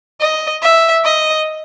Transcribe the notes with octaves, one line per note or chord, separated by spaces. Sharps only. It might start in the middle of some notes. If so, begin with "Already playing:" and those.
D#5
E5
D#5